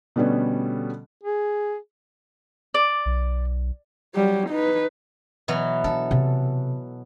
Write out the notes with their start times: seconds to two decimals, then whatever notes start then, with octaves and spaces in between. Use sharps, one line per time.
0.16 B2 D3 G3 A3 B3 C#4
1.23 G#4
2.74 D5
3.06 B1
4.15 F#3 G3
4.49 D#4 B4
5.48 B2 E3 F#3
5.84 D4 A4
6.11 C3